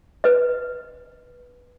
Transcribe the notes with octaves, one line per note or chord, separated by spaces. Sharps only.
B4 D#5